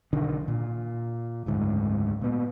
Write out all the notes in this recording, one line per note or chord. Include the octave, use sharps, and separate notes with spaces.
B1 D3 D#3 D4
A#2
F#1 D2 G#2
A#2 B3